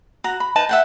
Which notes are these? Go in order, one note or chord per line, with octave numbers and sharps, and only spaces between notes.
F#4 A#5
B5
D#4 B4 A5
E5 F#5 G5